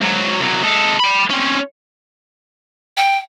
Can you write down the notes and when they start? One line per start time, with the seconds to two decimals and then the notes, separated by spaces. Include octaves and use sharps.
0.01 G#2 F#3
0.40 C2 F#3
0.63 G#3 A4
1.00 G5 B5
1.30 C4 C#4
2.97 G5